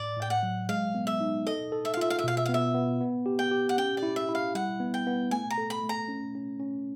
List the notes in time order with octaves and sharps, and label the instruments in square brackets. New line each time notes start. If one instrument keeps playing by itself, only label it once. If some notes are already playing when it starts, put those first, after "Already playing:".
Already playing: [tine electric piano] A2 [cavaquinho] D5
[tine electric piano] A2 [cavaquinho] G5
[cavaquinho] F#5
[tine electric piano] F#3
[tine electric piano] G#3 [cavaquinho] F5
[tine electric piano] B3
[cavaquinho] E5
[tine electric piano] D#4
[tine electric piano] A4 [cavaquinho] D#5
[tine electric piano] A4
[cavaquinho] E5
F5
[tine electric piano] F4 [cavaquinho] E5
[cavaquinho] F5
E5
[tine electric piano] B2 [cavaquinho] F5
[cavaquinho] E5
F5
[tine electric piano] B3
[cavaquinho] E5
[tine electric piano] B3
B3
G4
[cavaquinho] G5
[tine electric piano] G4
[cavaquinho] F#5
[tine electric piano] C#4 [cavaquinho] G5
[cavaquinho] D5
[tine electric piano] E4
[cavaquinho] E5
[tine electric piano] E4
[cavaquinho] F5
[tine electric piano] G3 [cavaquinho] F#5
[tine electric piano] B3
[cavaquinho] G5
[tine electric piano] B3
[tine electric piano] A3 [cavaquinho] G#5
[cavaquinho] A#5
[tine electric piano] A4
[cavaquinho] B5
[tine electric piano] A3
[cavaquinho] A#5
[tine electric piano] C#4
C#4
C#4